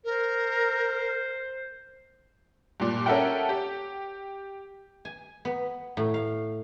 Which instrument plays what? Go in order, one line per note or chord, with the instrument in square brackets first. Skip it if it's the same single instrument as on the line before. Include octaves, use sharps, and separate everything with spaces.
[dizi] A#4 [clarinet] C5
[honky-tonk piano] G2 A#2
C#4 A4 A#4 E5 F#5 G5
G4
[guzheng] G#5
B3
A2
F5